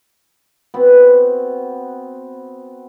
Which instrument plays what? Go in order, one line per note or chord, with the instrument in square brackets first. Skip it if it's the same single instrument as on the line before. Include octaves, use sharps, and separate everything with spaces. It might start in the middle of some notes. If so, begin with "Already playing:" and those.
[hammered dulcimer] B3 C4 F#4